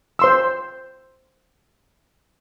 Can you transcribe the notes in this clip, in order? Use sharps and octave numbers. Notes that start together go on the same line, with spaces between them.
C5 C6 E6